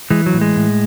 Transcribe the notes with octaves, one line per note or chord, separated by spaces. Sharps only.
E3 G#3
F#3
A2
G#3
A2